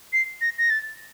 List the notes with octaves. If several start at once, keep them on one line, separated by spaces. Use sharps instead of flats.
C7
A#6
A#6
A6